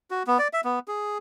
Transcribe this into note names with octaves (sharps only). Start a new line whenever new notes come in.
F#4
B3
D5
E5
B3
G#4